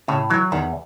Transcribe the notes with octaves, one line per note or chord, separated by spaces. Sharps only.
A2 C#3
E3 F#3
E2 D#3